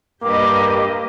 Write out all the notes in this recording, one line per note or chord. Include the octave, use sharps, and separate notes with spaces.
G2 A#3 G4 B4 D#5 D6